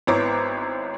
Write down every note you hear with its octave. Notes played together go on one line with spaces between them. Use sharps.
G#1 B3 E4 C#5 A#5 D6